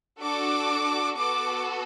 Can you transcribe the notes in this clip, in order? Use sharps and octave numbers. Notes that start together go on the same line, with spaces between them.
D4 F#4 A4 D6
B3 F#4 A4 D6